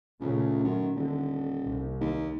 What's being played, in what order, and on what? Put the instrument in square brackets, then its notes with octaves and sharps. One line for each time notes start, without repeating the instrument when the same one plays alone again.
[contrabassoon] C#2 [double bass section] A#2 C#3 A3
[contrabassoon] F#2 [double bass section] D#3
[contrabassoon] D#1 [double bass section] D3
[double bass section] C2
[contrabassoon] D#2